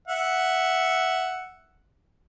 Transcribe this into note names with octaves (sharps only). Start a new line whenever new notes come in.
E5 F#5